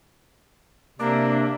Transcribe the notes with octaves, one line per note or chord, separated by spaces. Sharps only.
C3 A#3 D4 D5 E5